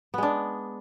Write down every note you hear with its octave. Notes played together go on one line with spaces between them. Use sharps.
G#3 B3 D4